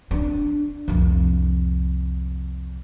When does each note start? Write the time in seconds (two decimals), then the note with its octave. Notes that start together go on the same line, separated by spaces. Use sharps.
0.11 D4
0.88 C2 F2